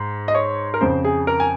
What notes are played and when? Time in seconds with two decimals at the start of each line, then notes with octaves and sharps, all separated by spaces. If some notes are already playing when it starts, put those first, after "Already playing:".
Already playing: G#2
0.28 D#5
0.35 C#5
0.74 A#4
0.81 F2 C#3 C5
1.05 G#4
1.27 A#4
1.40 G#5